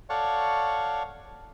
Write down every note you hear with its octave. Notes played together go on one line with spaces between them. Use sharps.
A4 C#5 D5 F5 F#5 C#6